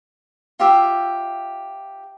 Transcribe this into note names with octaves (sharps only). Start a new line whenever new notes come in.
F4 G4 E5